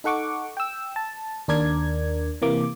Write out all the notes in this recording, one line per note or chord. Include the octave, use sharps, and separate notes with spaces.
D#4 A4 F#5 C#6 D6
G5 E6
A5
D#2 D4 A#4 D5 G#6
C3 E3 A#3 D6